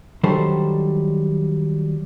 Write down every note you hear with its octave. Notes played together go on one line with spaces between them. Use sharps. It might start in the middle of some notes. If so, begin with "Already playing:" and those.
D#3 F#3 G3 D4 A4 C5